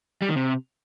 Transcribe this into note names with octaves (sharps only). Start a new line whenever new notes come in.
G3
D#3
C3